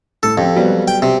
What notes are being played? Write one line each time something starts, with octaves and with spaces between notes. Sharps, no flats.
A2 A4
F2 C4 G4
F#3 G3 B3
G5
C3